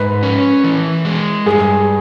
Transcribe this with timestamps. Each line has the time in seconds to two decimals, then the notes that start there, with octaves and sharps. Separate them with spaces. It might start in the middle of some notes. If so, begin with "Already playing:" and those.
Already playing: G#2 B4
0.23 C#4
0.64 E3
1.05 G#3
1.46 G2 G#4